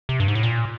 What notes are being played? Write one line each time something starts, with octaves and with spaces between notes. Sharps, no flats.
C3
G2
G#2
A2
A#2